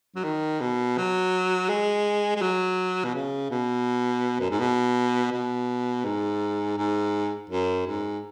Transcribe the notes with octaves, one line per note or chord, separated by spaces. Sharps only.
F#3
D#3
B2
F#3
G#3
G#3
F#3
B2
C#3
B2
F#2
G#2
B2
B2
G#2
G#2
F#2
G#2